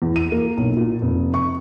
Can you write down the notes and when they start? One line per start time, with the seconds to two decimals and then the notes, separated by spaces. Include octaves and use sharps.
0.02 E2
0.16 D#7
0.32 A#3
0.57 B1
0.77 A#2
1.02 F1
1.34 C#6